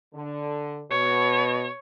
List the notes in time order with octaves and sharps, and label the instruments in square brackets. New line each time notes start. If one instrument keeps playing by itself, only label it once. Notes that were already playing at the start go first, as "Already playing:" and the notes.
[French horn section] D3
[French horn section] B2 [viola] C#5